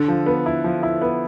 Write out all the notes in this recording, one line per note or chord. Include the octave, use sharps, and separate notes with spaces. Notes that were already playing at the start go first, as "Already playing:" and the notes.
Already playing: D3 A4
F3
B3
E4
F3
E4
B3